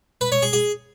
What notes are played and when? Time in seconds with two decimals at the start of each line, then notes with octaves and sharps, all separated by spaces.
0.21 B4
0.32 C#5
0.42 G#4
0.53 G#4